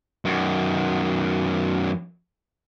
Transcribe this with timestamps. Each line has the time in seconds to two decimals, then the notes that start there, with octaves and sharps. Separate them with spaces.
0.25 F#2 D#3